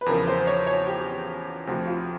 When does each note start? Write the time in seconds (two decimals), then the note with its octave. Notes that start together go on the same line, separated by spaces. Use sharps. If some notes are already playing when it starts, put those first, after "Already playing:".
0.01 B4
0.06 E2 C#3 F3 A#4
0.27 C5
0.47 C#5
0.67 C#5
0.87 G4
1.67 D2 C3 F3 F#4
1.87 F4